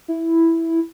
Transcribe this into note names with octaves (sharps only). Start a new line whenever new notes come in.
E4